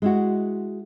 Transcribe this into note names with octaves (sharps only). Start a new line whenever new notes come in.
G#3 E4 F#4